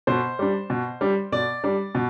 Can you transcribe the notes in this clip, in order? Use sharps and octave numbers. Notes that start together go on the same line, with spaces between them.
B2 C5
G3 D4
B2
G3 D4
B2 D5
G3 D4
B2